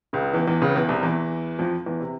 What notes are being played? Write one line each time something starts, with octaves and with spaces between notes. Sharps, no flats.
C#2 C#3
E2 E3
E2 E3
C#2 C#3
E2 E3
C2 C3
E2 E3
F2 F3
E2 E3
C3